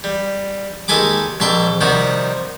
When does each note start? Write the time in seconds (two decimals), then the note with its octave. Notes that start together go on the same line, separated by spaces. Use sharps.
0.04 G3
0.88 D#2 G#3 A4 G#5 B5 D6
1.40 A#1 F2 E5 A5 C6 D6
1.81 C3 D#3 F3 G3 F#4